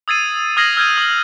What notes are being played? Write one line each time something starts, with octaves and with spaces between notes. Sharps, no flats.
D#6 E6 G#6 A6 C7 D#7
D#6 F6 G#6 A#6 C7 F#7
E6 F6 G6 G#6 A#6 D#7
D#6 F#7